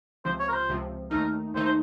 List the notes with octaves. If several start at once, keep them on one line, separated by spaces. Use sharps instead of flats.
C#2 C3 F3 C5
C#5
A#4
C5
C#2 C3 F3
D#2 D#3 A3 D#4 A#4
D#2 D#3 A3 D#4 C5
C5